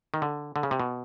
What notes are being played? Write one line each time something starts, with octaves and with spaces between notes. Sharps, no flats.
D#3
D3
D3
C#3
C3
B2